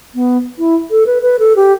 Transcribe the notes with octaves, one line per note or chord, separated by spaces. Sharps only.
B3
E4
A4
B4
B4
A4
G4